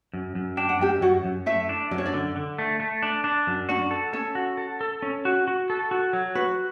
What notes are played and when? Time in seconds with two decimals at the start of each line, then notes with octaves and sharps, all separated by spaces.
0.13 F#2
0.35 F#2
0.57 D4 G5
0.69 F#5
0.79 F#2 G4 G5
1.02 F#2 F#4 F#5
1.25 F#2
1.46 A3 E4 E5
1.69 D4
1.91 F#2 D5
1.98 C#5
2.06 D4 D5
2.14 D3
2.36 D3
2.59 A3
2.80 A3
3.02 D4
3.24 D4
3.47 F#2
3.69 D4 F#4 D5
3.91 A4
4.13 C#4 A4 C#5
4.35 F#4
4.57 A4
4.81 A4
5.02 C#4
5.25 F#4
5.47 F#4
5.70 A4
5.91 F#4
6.13 F#3
6.35 F#4 B4